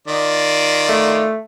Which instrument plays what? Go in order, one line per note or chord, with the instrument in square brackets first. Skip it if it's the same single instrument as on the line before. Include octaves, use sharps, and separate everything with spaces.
[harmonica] D#3 F4 D5
[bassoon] A3